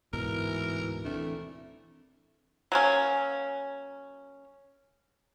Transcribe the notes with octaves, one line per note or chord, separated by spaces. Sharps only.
D1 G#2 B2 E3 A#4
E3 A3 C4 D4
F#3 A#3 C#4